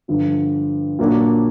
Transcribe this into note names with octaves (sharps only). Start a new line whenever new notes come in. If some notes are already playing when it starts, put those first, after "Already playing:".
G2 D3 F3
A#2 F#3 A#3 D4